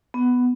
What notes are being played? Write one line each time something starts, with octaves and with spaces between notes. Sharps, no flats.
B3